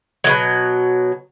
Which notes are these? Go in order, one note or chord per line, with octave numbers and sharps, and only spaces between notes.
B2 D#3 F#3